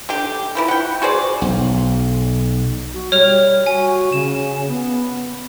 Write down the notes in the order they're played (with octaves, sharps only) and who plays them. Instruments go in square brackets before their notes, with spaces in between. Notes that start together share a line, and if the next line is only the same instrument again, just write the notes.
[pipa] D3 G4
E3 F3 E4
F#5 G5
F#4 G#4 C5 D5
[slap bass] B1
[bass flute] F#4
[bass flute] G3 [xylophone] C#5 F6 F7
[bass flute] F#4 [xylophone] G#5
[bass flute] C#3 [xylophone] E7
[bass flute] B3